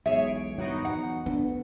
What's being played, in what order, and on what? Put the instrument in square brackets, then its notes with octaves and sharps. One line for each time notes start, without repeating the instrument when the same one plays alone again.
[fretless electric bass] E1 B1 [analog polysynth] G#4 C#5 [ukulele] E5
[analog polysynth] D7
[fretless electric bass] G2 D#3 F#3 [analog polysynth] B3 D#4 F#4
[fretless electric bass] E2 B2 [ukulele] F#5
[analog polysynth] D2 [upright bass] D3 [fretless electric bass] B3